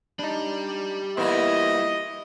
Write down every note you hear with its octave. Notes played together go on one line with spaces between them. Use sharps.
G3 D4 D#4 B5
A#2 E3 A#3 B3 E4 C5 D#5